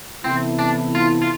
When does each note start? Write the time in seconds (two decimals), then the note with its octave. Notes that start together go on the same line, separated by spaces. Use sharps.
0.24 C3 E3 B3 C4 E4 A4
0.59 D4
0.95 F4
1.22 F4